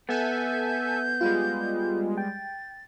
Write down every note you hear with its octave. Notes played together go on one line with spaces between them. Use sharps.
B3 A4 E5 G#5 G6
G3 G#3 F4
G5 A6